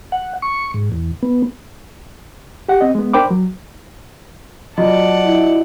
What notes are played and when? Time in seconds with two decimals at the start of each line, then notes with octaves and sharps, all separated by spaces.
0.12 F#5
0.42 C#6
0.74 G#2
0.92 E2
1.23 B3
2.68 G4 F#5
2.81 C4 D#5
2.95 G#3 B3
3.13 D4 A#4 C5 G5 B5 D6
3.30 F#3
4.78 F#3 F4 F#4 D5 D#5 F#5 A5
5.26 E4